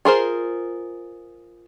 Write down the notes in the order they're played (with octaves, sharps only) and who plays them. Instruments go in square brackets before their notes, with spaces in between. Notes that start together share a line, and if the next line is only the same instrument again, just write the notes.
[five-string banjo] F4 G#4 A#4 C5